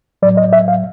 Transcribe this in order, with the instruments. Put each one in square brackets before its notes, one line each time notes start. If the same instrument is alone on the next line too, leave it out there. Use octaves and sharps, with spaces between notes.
[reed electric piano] A2 F#3 D5
D#5
E5
F5